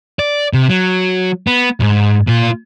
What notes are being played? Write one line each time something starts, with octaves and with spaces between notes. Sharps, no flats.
D5
C3
F#3
B3
D2 G#2
A#2 F4